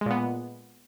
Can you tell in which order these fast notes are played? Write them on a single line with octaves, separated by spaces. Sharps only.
G#3 A#2 B3